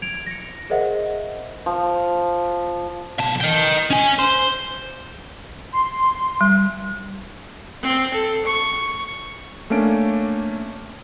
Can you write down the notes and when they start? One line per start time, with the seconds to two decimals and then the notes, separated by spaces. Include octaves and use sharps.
0.02 G#6 D7 F7
0.27 A#6 C#7
0.70 G#4 A#4 C5 D#5 E5 F#5
1.66 F3
3.19 B1 A5
3.40 D#5 G5
3.91 C#4 G#5
4.19 C5
5.73 C6
6.41 G3
7.83 C4
8.14 A4
8.46 C#6
9.70 A3 A#3 C#4 D4 D7